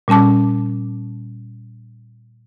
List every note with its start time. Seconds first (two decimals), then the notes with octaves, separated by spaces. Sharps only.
0.08 A#2 G3 C#4 A5 D6